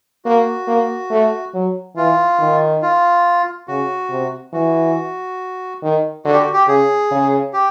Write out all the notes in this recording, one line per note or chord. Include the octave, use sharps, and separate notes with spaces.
A#3 F#4
A#3
A3
F#3
E3 F4
D#3
F4
C#3 F#4
C3
E3 F#4
D#3
D3 F#4
G4
F#4
G4
C#3 G#4
C#3
G4